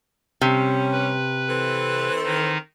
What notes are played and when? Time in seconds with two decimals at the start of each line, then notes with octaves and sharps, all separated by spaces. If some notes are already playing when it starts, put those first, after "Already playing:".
0.41 C3 G3 C#4
0.92 B4
1.48 E3 C4 A4
2.24 D#3 D#4